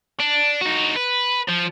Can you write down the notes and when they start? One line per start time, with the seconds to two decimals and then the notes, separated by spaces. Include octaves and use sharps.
0.20 D4
0.61 D#4 F#4
0.96 B4
1.48 F3